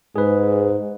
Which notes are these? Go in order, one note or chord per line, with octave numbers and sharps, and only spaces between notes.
G#2 G#4 B4